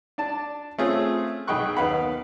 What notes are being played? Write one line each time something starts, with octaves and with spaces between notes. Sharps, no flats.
D4 D5 A5
A3 C4 C#4 F4 G#4
B1 G#4 G5 B5 C#6 F#6
D#2 B3 F5 F#5 B5